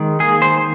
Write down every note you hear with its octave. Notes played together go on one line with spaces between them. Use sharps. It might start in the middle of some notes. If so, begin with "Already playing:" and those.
Already playing: D#3 G#3
A#3 G#4
C5